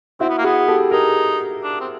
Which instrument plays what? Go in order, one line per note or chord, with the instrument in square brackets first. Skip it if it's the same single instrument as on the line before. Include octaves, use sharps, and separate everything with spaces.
[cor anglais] C4 [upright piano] E4 F#4
[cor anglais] B3
A#3
[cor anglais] B3 [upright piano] F#4 G#4
[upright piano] G4 A4
[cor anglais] D#4 [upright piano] G#4 A#4
[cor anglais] D4
C4